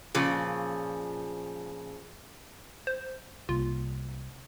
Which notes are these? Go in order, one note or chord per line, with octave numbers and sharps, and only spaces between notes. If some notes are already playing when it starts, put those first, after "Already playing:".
A#2 C#3 F3
C5
C2 C3 A#3 F4